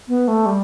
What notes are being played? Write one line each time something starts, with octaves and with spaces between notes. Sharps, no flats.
B3
A3
G3